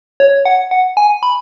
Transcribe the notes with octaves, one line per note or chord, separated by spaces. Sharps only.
C#5
F#5
F#5
G#5
B5